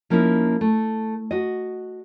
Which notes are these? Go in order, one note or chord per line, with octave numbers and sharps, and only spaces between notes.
F3 A#3 C#4 D#4 E4
A3
F#4 D#5